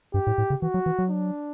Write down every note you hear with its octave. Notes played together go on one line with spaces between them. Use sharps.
G2 G4
A2
A2
C#3
E3 F#4
F#3
E3
F#3
D4